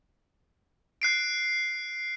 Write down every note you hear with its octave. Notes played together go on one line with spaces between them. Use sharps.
F#6 C7 D7